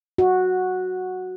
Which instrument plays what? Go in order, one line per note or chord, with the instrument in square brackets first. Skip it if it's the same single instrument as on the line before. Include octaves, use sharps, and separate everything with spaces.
[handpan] F#4